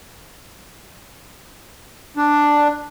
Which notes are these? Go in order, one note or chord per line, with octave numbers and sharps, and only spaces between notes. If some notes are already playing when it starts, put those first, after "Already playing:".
D4